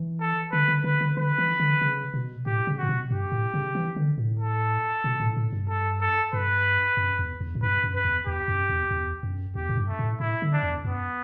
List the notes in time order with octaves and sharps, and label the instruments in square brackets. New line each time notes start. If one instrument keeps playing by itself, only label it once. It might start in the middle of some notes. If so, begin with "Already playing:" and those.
Already playing: [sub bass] E3
[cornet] A4
[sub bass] D3 [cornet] B4
[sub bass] D3
[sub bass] D3 [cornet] B4
[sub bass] D3
[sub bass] D3 [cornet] B4
[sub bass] E3
D3
C#3
B2
[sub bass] A2 [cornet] G4
[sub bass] C#3
[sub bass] A2 [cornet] F#4
[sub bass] B2
[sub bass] G2 [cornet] G4
[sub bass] A2
C#3
E3
D3
A2
[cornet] A4
[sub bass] B2
A2
A2
G2
[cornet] A4
A4
[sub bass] G2 [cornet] B4
[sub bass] F#2
E2
E2
A2
[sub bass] G2 [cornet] B4
[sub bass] F#2
[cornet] B4
[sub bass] E2
[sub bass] E2 [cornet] G4
[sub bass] F#2
E2
E2
F#2
[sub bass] E2 [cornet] G4
[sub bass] A2
G2
[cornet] A3
[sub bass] A2
[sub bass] A2 [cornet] E4
[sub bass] D3
[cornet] D4
[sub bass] E2
[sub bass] F#2 [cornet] B3